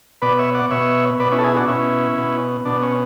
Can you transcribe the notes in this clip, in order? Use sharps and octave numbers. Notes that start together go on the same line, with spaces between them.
B2 B4 D5
C#5 E5
D5 F#5
B2 C#5 E5
B2 B4 D5
C#4 E4
A4
E4 G#4
D4 F#4
B2 C#4 E4
B2
B2 D4
C#4